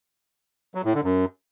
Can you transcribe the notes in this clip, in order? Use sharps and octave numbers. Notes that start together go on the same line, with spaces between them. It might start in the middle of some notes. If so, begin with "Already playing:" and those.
F#3
A2
D3
F#2